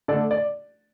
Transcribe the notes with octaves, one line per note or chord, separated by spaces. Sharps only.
D3 A3 A4 D5
D5